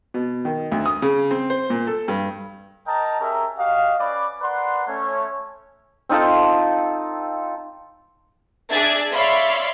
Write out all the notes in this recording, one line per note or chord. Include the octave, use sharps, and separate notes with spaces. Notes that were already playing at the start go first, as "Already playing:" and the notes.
B2
D#3
D2
D#6
C#3
C4
C5
A#2
A4
G2
A#4 D#5 G5 A5 A#5
C#4 G4 G#4 A#4 E5 A#5
F#4 G4 D#5 F5
C#4 B4 D5 B5 D6
A#4 B4 D5 F#5 C6
A3 C#4 C#5
C4 D#4 F4 A4
D4 G#4 D5 E5 G#6 A6
C#5 D5 E5 F5 B5 C6